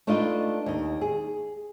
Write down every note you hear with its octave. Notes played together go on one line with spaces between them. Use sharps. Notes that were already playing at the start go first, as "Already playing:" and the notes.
A3 D4 D#4 F4 B4 D#5
D#2 D#5
G#4